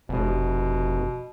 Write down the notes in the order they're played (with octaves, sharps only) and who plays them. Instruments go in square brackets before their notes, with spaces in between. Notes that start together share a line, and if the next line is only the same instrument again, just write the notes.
[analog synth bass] F1 [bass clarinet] B2